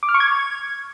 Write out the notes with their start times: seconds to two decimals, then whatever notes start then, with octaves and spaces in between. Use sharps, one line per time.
0.03 D6
0.09 F6
0.14 C#6
0.20 G#6